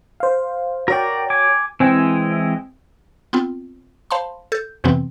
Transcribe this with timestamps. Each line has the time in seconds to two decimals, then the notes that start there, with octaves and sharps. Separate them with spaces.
0.20 C5 F5
0.88 F#4 A#4 C#5 D5 G5
1.30 G#5 D6
1.80 E3 G#3 C4 E4 G5 G#5
3.33 B3 C4 F4
4.11 C5 F5 A5 B5 C6
4.52 A4 G6
4.84 F2 C3 E3 B3 C4